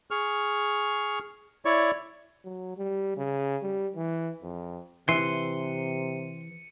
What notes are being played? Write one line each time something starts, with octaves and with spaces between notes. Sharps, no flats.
G#4 C#6 F6
E4 C#5 D5 C#6
F#3
G3
C#3
G3
E3
F2
C3 E3 C6 C#7 D#7